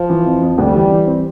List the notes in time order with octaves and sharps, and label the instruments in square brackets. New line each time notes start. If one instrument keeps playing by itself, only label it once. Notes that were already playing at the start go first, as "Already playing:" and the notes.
Already playing: [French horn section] F3
[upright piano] E3
F2
F2
[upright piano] D2 [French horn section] G3
[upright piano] E3
E3
C4